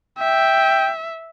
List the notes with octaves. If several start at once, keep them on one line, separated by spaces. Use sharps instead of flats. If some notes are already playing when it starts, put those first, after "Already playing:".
E5 G5